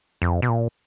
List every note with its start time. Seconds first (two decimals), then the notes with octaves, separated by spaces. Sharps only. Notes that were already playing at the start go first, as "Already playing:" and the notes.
0.22 F2
0.42 B2
0.49 A#2